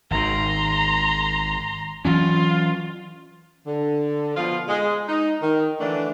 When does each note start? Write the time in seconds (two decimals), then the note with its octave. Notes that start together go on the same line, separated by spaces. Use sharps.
0.11 G#1 D#3 A#5 C6
2.05 E3 F#3 C#4 F4
3.67 D3
4.36 B2 F3 F4
4.68 G#3
5.08 D#4
5.42 D#3
5.80 D3 E3 A3 D4